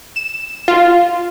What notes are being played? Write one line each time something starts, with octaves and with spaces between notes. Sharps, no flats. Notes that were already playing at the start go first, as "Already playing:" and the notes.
E7
F4